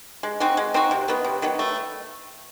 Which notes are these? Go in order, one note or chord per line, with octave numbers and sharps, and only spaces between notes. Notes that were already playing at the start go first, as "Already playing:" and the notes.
G#3
C4 D#4 F#4
G#3
C4 D#4 F#4
C3
D#3 F#3 B3
C3
D#3 F#3 B3
A3